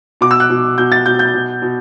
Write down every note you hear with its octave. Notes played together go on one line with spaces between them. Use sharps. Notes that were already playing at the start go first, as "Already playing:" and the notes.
B2 D6
E6
F#6
B2
B2 G6
A6
B2 G6
G6
B2
B2